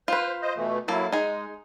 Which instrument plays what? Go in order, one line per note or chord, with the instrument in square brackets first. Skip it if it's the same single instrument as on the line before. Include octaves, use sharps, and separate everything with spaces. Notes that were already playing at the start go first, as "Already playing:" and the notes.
[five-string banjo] F4 B4 [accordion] C5
[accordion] C5 D#5
B2 E3 A3
[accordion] F#3 E4 [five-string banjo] A#3 A4
[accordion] G#3 [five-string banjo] D#4 G#4